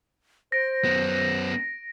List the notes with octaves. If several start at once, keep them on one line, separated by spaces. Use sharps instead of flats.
C5 A#6 D7
F#2 B3